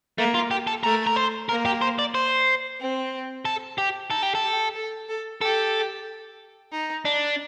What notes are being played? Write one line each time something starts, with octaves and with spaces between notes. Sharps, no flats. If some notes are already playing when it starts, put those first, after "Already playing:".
A3 A#3
F4
G4
A4
A3 A#4
A#4
C5
A#3 A#4
G4
C5
D5
C5
C4
A4
G4
D#4 A4
G4
A4
G4
A4
A4
G4 A4
D#4
D4